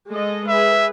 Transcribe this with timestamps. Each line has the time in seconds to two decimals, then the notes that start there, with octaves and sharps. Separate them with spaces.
0.11 G#3 A4 D#5
0.48 G#4 B4 E5